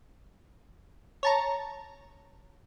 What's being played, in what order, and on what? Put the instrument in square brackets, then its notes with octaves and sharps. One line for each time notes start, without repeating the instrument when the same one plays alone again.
[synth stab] C#5 A5 A#5